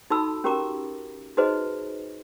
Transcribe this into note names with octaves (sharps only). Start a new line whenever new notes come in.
D#4 F#4 A4 A5 B5 E6
C#4 F#4 G4 A#4 A#5 D6
D#4 F#4 G#4 B4 C5 D#5